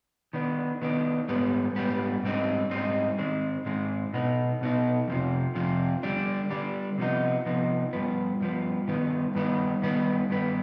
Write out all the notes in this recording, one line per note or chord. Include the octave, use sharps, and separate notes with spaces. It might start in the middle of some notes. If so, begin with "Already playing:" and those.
D#3 B3 D4
D#3 B3 D4
G#2 G3 B3
G#2 G3 B3
G#2 G3 C4 D#4
G#2 G3 C4 D#4
G#2 D#3 G#3 C4
G#2 D#3 G#3 C4
B2 B3 D#4
B2 B3 D#4
F2 C3 F3
F2 C3 F3
D3 G3 D4
D3 G3 D4
C3 F3 B3 D#4
C3 F3 B3 D#4
G2 F3 B3
G2 F3 B3
G2 D#3 B3
G2 D#3 B3
G2 D#3 B3
G2 D#3 B3